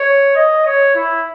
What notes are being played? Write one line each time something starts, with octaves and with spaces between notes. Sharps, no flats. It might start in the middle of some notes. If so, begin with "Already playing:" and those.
Already playing: C#5
D#5
C#5
E4